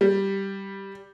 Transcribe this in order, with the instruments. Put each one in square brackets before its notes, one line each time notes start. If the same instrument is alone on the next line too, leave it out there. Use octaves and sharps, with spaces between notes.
[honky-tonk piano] G3